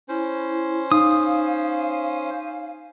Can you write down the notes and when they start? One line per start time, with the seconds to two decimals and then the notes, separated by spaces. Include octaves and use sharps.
0.09 C#4 E4 C5
0.92 D#4 F5 D#6